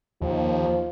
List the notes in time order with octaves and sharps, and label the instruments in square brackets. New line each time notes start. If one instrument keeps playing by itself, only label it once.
[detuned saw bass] D#2 [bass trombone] F3